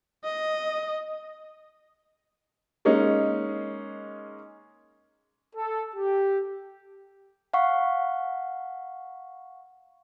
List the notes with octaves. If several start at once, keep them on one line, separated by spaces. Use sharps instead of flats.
D#5
G#3 A#3 C#4 D#4
A4
G4
F5 F#5 C#6